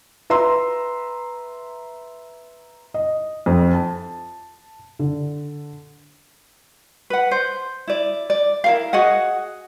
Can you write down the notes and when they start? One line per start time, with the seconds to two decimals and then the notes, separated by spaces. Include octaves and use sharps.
0.30 B4 E5 A#5 C6 E6
2.94 D#5
3.46 F2
3.73 A5
4.99 D3
7.10 B4 F#5
7.31 C5
7.88 E4 D5
8.30 D5
8.64 E4 A#4 F5
8.93 F#4 G#4 D#5 F#5